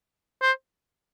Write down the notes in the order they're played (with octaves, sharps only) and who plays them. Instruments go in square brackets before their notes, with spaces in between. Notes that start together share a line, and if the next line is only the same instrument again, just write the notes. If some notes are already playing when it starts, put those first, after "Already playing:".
[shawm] C5